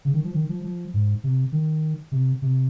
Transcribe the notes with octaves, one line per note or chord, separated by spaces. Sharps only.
C#3
D#3
F3
D#3
F3
F3
G#2
C3
D#3
C3
C3